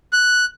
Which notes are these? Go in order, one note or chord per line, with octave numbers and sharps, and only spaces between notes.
F#6